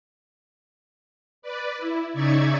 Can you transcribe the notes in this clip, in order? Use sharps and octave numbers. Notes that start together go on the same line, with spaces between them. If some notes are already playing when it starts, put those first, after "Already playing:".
B4 D5
E4
C#3 D#4 D5 E5 C#6 G#6